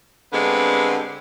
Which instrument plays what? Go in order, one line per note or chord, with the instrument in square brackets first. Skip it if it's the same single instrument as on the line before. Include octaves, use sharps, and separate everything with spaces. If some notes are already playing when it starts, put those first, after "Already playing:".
[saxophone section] G2 D3 G#3 B3 C4